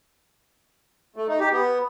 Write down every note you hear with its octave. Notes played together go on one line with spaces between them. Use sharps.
A3
D#4
G4
B3